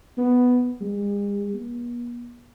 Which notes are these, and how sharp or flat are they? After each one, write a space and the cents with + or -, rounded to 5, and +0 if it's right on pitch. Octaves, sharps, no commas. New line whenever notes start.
B3 +5
G#3 -45
B3 -45